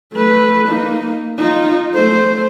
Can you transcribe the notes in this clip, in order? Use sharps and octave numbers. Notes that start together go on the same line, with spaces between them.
A3 B4
A#3 D#4
D#4 F4
A3 C5